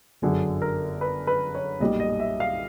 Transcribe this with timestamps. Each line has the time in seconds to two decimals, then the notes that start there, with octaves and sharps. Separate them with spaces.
0.22 G1 F#2 D3 F#3 G#4
0.62 A#4
1.01 B4
1.27 B4
1.55 C#5
1.80 B1 A#2 G3 D#5
2.00 D#5
2.20 E5
2.40 F5